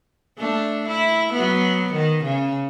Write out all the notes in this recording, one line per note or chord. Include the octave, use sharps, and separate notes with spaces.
A3 D4
E4
F#3 B3
D#3
C#3